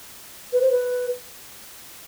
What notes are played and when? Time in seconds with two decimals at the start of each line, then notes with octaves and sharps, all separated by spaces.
0.53 B4
0.61 C5
0.71 B4